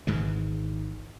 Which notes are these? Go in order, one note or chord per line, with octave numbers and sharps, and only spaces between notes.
G#1 G#2 E3 G#3